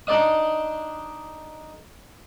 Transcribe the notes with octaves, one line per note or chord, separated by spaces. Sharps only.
D4 D#4 D5 D#5 D#6